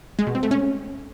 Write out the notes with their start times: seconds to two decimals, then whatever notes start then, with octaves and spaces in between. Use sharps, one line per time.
0.19 G#3
0.27 B2
0.35 C4
0.43 A3
0.51 C#4